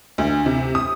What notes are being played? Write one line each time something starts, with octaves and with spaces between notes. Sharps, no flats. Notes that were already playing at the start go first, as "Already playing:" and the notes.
D2
C3
D#6